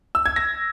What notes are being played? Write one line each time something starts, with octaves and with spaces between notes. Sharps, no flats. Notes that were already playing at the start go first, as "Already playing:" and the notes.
E6
G#6
A#6